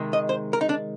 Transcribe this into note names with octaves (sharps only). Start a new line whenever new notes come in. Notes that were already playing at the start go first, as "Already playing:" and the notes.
Already playing: C3 D#3 G#3
D#5
C5
A#4
D#4
D4